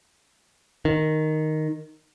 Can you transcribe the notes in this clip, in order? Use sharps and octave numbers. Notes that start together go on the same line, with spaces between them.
D#3